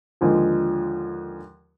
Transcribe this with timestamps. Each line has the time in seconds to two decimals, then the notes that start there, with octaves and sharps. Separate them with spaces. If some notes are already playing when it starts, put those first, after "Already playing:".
0.21 D#2 D3 F3 G#3